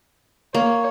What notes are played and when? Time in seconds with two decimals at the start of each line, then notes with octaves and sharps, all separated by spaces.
0.55 A#3 C#5